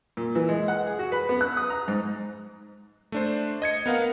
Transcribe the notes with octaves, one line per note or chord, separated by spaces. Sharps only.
A#2
E3
G#3
F#5
G#4
F#4
B4
B3
F#6
D#6
A#5
G#2
A3 D4 C5
D#5 G#6 C#7
B3 A#4 F5 F#5